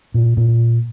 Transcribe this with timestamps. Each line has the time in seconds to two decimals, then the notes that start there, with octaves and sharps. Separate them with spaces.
0.14 A#2
0.37 A#2